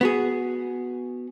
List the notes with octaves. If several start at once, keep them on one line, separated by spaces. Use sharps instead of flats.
B3 F#4 G#4